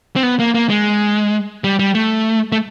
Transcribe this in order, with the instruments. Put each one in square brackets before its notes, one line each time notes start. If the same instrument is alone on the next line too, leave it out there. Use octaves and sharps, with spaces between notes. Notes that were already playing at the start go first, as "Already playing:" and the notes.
[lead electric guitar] C4
B3
A#3
A#3
G#3
G3
G3
A3
A3